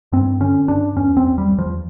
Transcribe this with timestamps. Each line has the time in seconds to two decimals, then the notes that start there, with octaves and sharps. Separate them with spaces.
0.12 G2 C4
0.40 D3 C#4
0.68 G2 D4
0.96 E2 C#4
1.17 C4
1.24 E2
1.38 G3
1.52 E2
1.58 F3